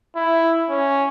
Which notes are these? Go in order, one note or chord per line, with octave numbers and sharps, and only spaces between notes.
E4
C#4